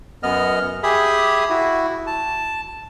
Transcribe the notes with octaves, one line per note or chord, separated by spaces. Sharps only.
F#2 B3 D#5 F6
G4 G#4 E5 G#5 B5 D#6
E4 F#4
A5